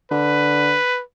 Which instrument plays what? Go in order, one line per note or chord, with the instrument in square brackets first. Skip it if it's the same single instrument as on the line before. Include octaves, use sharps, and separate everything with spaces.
[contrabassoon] D3 [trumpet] B4